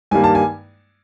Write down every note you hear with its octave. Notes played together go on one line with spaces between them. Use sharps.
G2 D#3 G3 A#3 G#5
A5
G#5